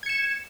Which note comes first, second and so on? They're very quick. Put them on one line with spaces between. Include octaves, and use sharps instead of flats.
G#6 C#7 E7